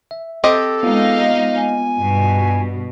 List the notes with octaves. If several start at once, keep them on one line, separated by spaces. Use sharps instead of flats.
E5
C4 G4 A4 D#5
G#3 B3 D#4 F4 F5
G#5
G2 B2